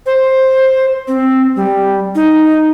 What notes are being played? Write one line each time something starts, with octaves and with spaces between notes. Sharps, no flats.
C5
C4
G3
D#4